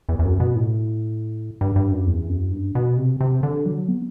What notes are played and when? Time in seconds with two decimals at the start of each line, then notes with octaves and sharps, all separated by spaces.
0.09 E2
0.19 E2
0.25 F#2
0.40 B2
0.55 A2
1.61 G2
1.76 G2
1.91 F#2
2.07 E2
2.29 F#2
2.51 G2
2.75 B2
2.97 C3
3.21 C3
3.43 D3
3.66 F#3
3.88 B3